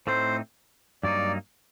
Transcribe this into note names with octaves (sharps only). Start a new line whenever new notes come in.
A2 A3 C4 D#4 C5
G2 F#3 A#3 D#4 D5